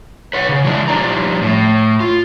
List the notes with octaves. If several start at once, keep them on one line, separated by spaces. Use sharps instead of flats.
B4 C#5 F#5
C#3
E3 G#3 D4 E4
F3 G3 D4 D5 A#5
A2
F4